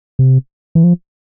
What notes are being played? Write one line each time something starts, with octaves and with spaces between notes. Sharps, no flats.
C3
E3
F3